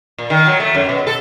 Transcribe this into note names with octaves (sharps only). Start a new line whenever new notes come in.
A#2
D#3
F#3
A3
F#2
B2
A4